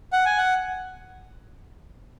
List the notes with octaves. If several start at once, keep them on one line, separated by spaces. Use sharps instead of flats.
F#5
G#5
F#5